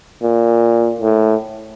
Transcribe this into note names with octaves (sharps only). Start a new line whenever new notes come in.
A#2
A2